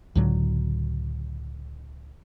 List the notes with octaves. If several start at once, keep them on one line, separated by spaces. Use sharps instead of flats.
C#2 A2 D3 F#3